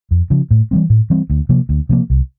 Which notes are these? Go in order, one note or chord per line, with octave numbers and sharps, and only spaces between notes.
F2
C#3 F3
A2
E3 G3 C4
A2
E3 G3 C4
D2
C3 F3 A#3
D2
C3 F3 A#3
C2